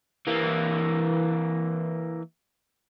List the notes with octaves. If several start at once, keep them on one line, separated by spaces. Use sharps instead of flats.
E3 A#3